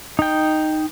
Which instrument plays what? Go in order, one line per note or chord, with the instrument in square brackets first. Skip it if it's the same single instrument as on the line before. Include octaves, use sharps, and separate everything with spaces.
[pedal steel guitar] D#4 G5